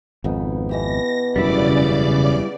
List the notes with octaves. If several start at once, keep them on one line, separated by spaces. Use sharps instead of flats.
G#1 F2 C#3 B3 D#4
B2 E3 G4 A#6
E1 F#2 C#3 G3 E4 D5 D6